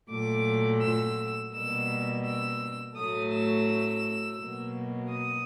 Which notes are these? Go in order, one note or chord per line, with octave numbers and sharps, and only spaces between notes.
A#2 F#3 A3 D6
E6
B2 G3 A#3 E6
E6
A2 F#3 A3 D#6
E6
B2 F#3 A#3
D#6